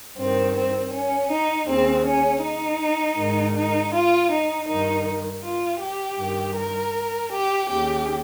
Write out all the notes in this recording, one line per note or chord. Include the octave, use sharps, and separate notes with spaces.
G2 D#3 C4
C4
C#4
D#4
D#2 C#3 C4
C#4
D#4
G#2 D#3
D#4
F4
D#4
G2 D#3 D#4
F4
G4
G2 D#3
A#4
G4
D#2 C#3 G4